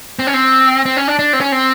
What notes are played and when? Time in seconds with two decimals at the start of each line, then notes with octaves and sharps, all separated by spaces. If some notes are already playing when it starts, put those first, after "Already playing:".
0.19 C4
0.27 C#4
0.34 C4
0.85 C4
0.97 C#4
1.08 D4
1.19 D4
1.33 C4
1.41 C#4
1.52 C4